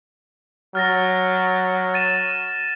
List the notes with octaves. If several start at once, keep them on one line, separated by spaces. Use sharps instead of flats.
F#3 F6 A6 A#6
A6 D#7 E7